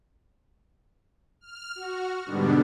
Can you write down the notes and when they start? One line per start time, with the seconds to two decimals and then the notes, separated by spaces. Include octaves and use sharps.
1.41 F6
1.75 F#4
2.25 G#2 B2 D3 G3 B3 D4